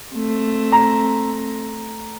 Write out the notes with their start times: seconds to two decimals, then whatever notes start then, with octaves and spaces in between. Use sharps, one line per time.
0.13 A3 C4
0.72 A#5